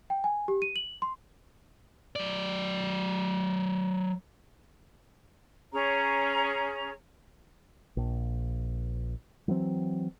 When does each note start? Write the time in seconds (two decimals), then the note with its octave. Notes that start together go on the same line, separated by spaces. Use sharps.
0.10 G5
0.24 G#5
0.48 G4
0.62 D#7
0.76 F#7
1.02 C6
2.16 F#3 D5
5.72 C#4 G#4 C#5 A#5
7.97 A#1
9.48 E3 F#3 A#3 C4